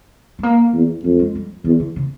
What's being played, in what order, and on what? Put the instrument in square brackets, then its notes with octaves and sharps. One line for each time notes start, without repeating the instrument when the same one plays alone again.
[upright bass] A3
A#3
[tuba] E2
[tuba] F2 [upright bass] A3
[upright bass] G#3
G3
[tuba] E2 [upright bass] F3
[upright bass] D3
C#3